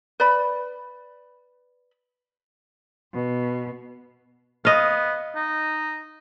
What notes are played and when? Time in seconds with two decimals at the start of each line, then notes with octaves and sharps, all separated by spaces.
0.20 B4 D5 B5
3.14 B2
4.65 B3 D#5 F5
5.35 D#4